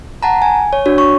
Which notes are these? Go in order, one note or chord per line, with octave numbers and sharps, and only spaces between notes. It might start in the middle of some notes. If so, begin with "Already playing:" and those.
F#5 A5 A#5
G#5
C#5
D4 F#4 C#5
C#6